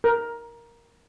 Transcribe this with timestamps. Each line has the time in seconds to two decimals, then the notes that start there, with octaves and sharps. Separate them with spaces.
0.04 A#4